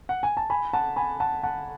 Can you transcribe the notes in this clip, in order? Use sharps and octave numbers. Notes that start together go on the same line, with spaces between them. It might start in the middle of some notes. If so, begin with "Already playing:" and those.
F#5
G#5
A5
G#5 B5
F#5 A5
G#5 B5
F#5 A5
F#5 A5